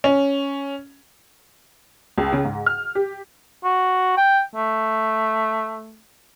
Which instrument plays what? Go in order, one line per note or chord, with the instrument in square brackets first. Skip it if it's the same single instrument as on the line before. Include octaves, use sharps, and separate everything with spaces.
[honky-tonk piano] C#4
C#2
C#3
G#2
F6
G4
[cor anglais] F#4
G5
A3